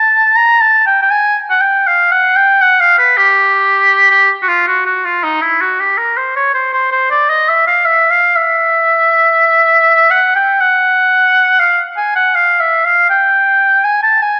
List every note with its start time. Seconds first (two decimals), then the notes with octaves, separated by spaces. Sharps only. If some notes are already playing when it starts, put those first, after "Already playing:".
Already playing: A5
0.36 A#5
0.61 A5
0.86 G5
1.02 G5
1.11 G#5
1.50 F#5
1.61 G5
1.87 F5
2.12 F#5
2.36 G5
2.62 F#5
2.80 F5
2.98 B4
3.17 G4
4.11 G4
4.42 F#4
4.48 F4
4.67 F#4
4.86 F#4
5.05 F4
5.23 D#4
5.41 E4
5.61 F#4
5.80 G4
5.98 A#4
6.17 C5
6.36 C#5
6.54 C5
6.73 C5
6.92 C5
7.10 D5
7.29 D#5
7.49 E5
7.67 F5
7.85 E5
8.11 F5
8.36 E5
10.10 F#5
10.36 G5
10.61 F#5
11.59 F5
11.97 G#5
12.16 F#5
12.35 F5
12.60 E5
12.85 F5
13.10 G5
13.84 G#5
14.03 A5
14.22 G#5